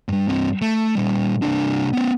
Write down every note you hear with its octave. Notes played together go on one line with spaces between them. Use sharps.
G2 G3
G2 C4
A3
A#2 G3
C2 D4
B3 C#4